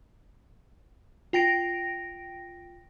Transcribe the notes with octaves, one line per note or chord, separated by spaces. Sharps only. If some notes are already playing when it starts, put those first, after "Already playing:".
F4 G5 A#6 D7